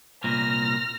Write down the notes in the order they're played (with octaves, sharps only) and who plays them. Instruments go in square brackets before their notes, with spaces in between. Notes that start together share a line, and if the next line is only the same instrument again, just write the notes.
[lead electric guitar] C2 A#2 [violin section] F6 A#6